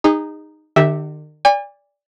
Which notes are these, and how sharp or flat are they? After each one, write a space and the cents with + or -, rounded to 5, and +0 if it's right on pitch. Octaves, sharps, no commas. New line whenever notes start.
D#4 -10 G#4 -35
D#3 -45 G4 +0 E5 -10
D5 -15 G#5 -40